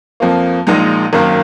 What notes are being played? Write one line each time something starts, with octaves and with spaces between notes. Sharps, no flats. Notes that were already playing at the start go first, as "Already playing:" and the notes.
F2 F3 A#3
A#1 A#2 G#3 D#4
G#1 F#2 D#3 A#3